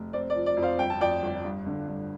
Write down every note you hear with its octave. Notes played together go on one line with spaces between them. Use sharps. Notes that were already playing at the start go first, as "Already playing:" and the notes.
Already playing: F1
C4 D5
D5
F3
D5
F2
C5 F5
G1 G5
A5
F2 D5 G5
G1
G2
D3
G2